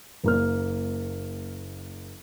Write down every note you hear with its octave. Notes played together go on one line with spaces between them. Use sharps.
F#1 A#3 F6